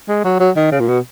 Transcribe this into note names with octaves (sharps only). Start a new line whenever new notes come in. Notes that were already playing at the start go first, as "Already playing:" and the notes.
G#3
F#3
F#3
D#3
C#3
A#2
B2